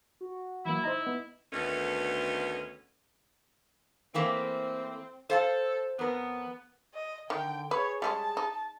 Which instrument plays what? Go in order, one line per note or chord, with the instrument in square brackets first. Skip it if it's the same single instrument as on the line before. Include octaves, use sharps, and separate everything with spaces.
[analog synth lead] F#4
[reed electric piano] E3 F#3 A#3 [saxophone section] E4
[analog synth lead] D#4 [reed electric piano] C5 D#5 A#5
[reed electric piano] B3
[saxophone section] D2 D#3 A3 B3 C#4
[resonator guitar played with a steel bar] E3 A3 A#3 [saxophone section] C4
[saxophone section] A4 [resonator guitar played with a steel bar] C5 F5 A5
[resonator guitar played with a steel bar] F2 A#4 [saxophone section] B3
[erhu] D#5
[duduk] D3 [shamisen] D#3 [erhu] G5
[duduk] G#4 [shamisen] B4 [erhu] C#5
[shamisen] G3 G#3 C#4 [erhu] A5
[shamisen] D#4